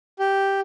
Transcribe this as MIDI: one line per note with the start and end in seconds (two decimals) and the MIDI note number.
0.19 0.60 67